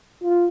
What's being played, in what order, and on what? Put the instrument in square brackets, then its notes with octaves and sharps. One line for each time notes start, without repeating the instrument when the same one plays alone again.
[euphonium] F4